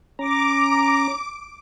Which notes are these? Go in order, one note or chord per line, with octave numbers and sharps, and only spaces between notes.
C#4 A#5 D6